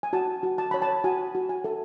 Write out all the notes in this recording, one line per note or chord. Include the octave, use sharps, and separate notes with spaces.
G#5
F#4 A5
F#4
A5
C#5 B5
A5
F#4 G#5
F#4
G#5
A4